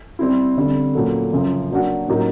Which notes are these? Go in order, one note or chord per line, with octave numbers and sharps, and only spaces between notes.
G3 C4 E4
D3 G3 C4
A#2 F#3 A3
F#2 C#3 F3
F#3 A#3 D4 F#4
A2 F#3 A#3 D#4 G4